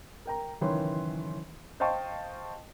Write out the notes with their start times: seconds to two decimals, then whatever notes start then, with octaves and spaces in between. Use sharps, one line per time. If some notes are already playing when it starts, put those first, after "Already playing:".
0.26 A#4 G5 A#5
0.61 F#1 D#3 E3 C#4 B4 C6
1.80 C5 D#5 F5 G5 A5 C#6